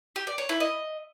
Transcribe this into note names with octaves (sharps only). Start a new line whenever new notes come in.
G4
D5
C#5
E4
D#5